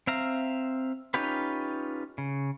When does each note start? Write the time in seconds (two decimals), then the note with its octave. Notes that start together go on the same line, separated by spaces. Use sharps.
0.07 C4 E5 F5 A#5
1.14 C#4 D#4 F4 G4 B4
2.18 C#3